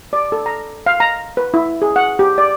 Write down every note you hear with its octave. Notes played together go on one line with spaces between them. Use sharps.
D5
A4
A#5
F5
A#5
B4
E4
G#4
F#5
G4
D5